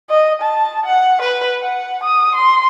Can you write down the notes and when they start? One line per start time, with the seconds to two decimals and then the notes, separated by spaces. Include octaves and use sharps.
0.10 D#5
0.42 A5
0.86 F#5
1.22 B4
1.61 F#5
2.03 D#6
2.35 C6